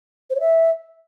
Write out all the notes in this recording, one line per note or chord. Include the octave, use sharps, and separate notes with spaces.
C5
C#5
E5